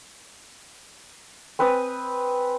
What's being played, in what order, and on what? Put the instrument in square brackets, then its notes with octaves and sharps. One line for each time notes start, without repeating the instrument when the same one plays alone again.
[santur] C4 B4 G#5 D#6